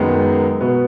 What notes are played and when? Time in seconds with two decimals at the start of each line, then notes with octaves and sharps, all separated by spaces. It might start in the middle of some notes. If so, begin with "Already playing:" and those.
Already playing: F#2 D#3 G#3 B3
0.61 B2 B3